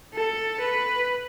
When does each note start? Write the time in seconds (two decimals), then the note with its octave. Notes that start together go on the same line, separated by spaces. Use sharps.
0.14 A4
0.60 B4